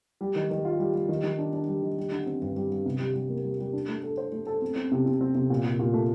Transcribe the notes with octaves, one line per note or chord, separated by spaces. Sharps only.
G3
D#3
D#3
F4
G3
G3
D#3
D#3
D4
D4
G3
D#3
G3
D3
C4
G2
G3
G3
C3
G3
G3
A#3
G3
G3
D4
A3
A4
C5
A3
A4
C4
C4
C3
C3
C4
C3
A#2
A#2
A#2
A3